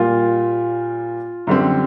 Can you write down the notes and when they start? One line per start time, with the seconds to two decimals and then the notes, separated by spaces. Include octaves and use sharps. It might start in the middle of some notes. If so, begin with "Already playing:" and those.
Already playing: A#2 G3 A#3 F4
1.47 F#2 D3 G3 C4